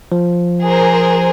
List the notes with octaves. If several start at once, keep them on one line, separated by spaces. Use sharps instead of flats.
F3
G#4 A#4 C5